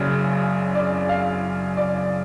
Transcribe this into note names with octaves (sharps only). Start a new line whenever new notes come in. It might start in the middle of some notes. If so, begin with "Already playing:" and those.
Already playing: F#1 F#2 C#3 D5
D5
F5
D5